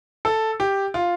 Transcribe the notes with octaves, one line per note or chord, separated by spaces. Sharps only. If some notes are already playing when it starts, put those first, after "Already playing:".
A4
G4
F4